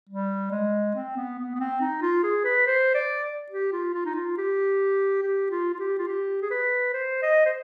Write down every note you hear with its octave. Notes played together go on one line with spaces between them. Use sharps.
G3
G#3
C4
B3
B3
B3
C4
D#4
F4
G#4
B4
C5
D5
G4
F4
F4
D#4
F4
G4
G4
F4
F4
G4
F4
G4
G#4
B4
C5
D#5
C5